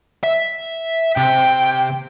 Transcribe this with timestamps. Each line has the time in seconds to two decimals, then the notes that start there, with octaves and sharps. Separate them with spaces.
0.23 E5
1.17 C3 G5